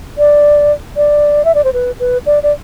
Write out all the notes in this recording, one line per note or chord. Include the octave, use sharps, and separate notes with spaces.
D5
D5
E5
D5
C5
B4
B4
D5
D5